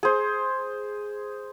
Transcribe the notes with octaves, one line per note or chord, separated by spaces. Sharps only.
G#4 C5